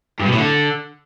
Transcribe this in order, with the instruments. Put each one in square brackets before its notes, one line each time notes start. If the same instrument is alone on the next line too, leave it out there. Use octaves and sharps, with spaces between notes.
[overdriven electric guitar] G2
B2
A2
D3